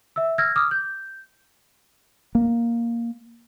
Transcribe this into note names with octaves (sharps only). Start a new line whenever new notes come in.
E5 E6
E6 F6 G#6 A#6
D6 D#6 F6
G6
A#3